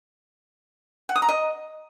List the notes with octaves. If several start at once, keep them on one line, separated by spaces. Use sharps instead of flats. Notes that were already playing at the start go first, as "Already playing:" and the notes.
F#5
D#6
A#5
D#5